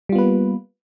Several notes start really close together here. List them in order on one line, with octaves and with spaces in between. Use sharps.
G3 F4 B3 B4 A#3